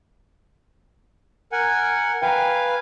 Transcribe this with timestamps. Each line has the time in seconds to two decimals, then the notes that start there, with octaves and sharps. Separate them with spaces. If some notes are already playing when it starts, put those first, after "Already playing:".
1.52 A#4 F#5 G#5
2.22 B4 F5 G5 G#5 A#5